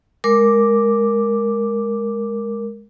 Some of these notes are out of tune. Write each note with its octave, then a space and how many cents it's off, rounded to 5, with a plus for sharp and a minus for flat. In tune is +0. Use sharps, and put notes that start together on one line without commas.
G#3 +0 A#4 +0 D6 +0